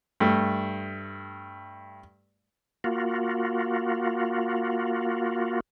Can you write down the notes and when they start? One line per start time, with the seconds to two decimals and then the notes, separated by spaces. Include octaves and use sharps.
0.20 G2 A3
2.84 A#3 F4 F#4